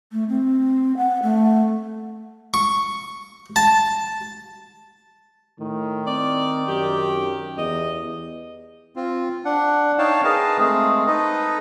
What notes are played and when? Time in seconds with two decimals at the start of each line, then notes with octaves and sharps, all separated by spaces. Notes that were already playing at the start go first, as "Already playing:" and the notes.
0.12 A3
0.29 C4
0.97 F#5
1.23 A3
2.54 C#6
3.56 A5
5.59 A2 D#3
6.07 C4 D5
6.68 F#2 G4
7.57 E2 D#5
8.96 C4 F4
9.45 D4 F#5
9.98 D#4 C#5 F5 G5 A5
10.24 G#4 A#4 B4 D#5 F5 A5
10.58 G#3 A3 C4 G#4
11.07 D#4 A4 B4 D#5